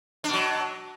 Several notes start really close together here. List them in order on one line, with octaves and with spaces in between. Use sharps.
D4 B2 F#3